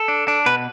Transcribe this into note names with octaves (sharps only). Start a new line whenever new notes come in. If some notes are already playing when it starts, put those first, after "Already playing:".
Already playing: A4
D4
D4
B2 B4